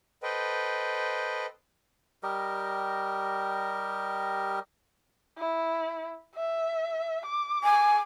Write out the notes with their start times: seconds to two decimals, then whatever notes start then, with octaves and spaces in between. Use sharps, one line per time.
0.23 A4 B4 C5 D#5 G5
2.23 G3 G4 A#4 D#5
5.37 E4
6.36 E5
7.26 D6
7.64 G#5